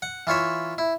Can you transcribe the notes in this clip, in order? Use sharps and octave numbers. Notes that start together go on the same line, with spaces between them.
F#5
E3 F4 C#5 E5
E4